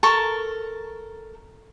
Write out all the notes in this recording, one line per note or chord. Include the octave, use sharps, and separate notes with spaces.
A4 A#4 A5 C#6